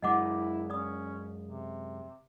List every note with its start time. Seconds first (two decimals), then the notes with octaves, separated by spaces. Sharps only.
0.02 F#2 G#3 E4 D#5 F#5 D6
0.70 C#4 D5 B5 D#6
1.43 C3